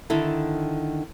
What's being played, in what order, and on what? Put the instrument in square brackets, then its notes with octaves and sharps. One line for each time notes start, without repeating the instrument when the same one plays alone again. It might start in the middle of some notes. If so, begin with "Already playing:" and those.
[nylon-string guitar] D3 D#3 E4 A4